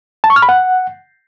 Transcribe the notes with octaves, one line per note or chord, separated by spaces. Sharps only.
A5
C#6
F6
B5
F#5